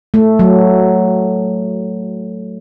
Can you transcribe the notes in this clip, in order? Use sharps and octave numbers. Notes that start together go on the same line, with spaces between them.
A3
F#3